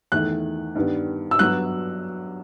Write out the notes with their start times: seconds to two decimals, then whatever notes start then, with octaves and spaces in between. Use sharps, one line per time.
0.12 E2 D#3 A3 F#6
0.75 G2 D#3 G3 B3
1.31 E6
1.39 G2 F#3 B3 F#6